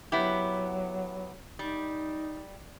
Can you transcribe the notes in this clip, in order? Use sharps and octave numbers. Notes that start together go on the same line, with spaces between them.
F#3 B3 E4 G4
G3 D#4